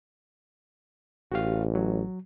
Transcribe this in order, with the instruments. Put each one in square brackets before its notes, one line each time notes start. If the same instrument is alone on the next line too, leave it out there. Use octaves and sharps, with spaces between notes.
[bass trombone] A1 [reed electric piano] F#4 G4 F5
[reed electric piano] F#3